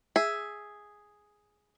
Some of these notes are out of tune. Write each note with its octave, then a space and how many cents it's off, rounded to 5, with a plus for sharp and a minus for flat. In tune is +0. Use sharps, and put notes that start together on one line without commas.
G#4 +0 E5 +0